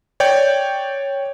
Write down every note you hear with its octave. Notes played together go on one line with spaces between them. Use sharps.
C#5 D5 G5 G6